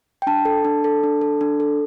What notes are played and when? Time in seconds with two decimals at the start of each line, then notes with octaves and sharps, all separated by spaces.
0.22 G5
0.27 D4 A5
0.45 A4
0.65 D4
0.84 A4
1.04 D4
1.21 A4
1.41 D4
1.60 A4